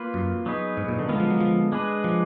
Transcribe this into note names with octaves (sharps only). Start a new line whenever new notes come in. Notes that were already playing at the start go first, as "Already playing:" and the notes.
Already playing: A#3 F4 B4
F#2
F#3 B3 D#4 G#4 B4
G#2
A#2
D3
D3 D#3 G#3 B3 F4
F3
F#3
F3
G#3 D4 G#4 B4
F3